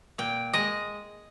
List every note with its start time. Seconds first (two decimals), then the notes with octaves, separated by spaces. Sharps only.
0.18 A#2 G5
0.53 G#3 D#5